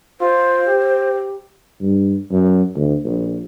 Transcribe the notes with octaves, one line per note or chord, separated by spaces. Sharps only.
F4 C5
G4
G2
F#2
D2
A#1